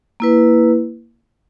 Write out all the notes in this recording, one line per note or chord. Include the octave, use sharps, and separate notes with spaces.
A#3 E4 B4